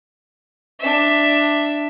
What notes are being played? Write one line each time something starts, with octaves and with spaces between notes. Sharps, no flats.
D4 E5